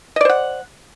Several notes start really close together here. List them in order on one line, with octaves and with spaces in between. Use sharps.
D#5 D5 C5 F#5